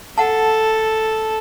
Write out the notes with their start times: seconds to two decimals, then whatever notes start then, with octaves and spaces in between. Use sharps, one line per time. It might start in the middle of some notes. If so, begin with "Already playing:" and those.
0.18 A4 F#5 A5